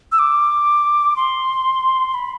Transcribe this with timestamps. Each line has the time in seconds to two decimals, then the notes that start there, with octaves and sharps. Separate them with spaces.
0.12 E6
0.19 D6
1.16 C6
2.14 B5